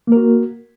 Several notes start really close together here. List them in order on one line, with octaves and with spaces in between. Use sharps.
A#3 A#4 F#4